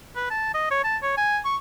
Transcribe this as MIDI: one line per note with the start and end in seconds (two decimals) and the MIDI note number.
0.16 0.30 71
0.31 0.51 81
0.54 0.66 75
0.71 0.84 73
0.84 0.97 81
1.03 1.17 73
1.17 1.39 80
1.45 1.57 85